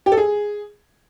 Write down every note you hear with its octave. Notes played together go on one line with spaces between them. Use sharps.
G4
A4
G#4